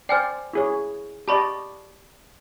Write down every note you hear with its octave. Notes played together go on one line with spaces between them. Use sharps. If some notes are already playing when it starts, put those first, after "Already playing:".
C5 D5 G5 G#5 F6
E4 G#4 C#5
G4 D5 D#5 A5 B5 C#6